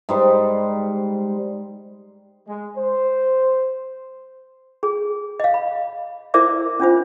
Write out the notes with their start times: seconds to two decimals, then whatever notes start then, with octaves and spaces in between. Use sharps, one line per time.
0.09 G#2 G3 C5
2.46 G#3
2.76 C5
4.83 G#4
5.40 D#5 F5
5.54 B5
6.34 E4 A#4 C5 D5 E5 D6
6.80 C#4 D4 F4 C5